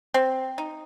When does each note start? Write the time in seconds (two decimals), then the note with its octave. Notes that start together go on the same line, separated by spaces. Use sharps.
0.14 C4
0.58 D#4